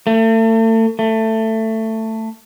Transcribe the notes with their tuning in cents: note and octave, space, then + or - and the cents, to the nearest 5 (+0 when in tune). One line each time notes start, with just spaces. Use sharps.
A3 +35
A3 +15